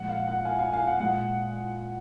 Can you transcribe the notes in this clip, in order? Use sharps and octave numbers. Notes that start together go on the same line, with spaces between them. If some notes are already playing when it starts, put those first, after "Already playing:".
Already playing: A#2 F3 G#3 F#5
F5
F#5
F5 G#5
F5 G#5
F5 G#5
F#5
A#2 G#3 F#5